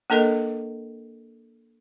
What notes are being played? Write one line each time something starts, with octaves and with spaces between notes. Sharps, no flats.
A#3 D4 A4 A#4 D#5